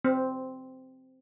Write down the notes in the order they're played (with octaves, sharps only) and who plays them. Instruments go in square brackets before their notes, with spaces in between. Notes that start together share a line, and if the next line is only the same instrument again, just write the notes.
[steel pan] C4